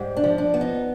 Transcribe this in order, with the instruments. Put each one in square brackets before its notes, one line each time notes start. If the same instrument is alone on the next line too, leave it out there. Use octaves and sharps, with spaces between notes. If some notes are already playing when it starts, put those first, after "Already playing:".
Already playing: [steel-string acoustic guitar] G#2 G3
D4
F3
D4
B3
D#4